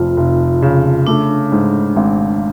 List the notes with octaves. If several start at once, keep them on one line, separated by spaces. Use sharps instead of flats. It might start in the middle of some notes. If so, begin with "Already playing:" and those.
Already playing: F1 F2 F4
F1
C#3
A3 D4
G#2
G#1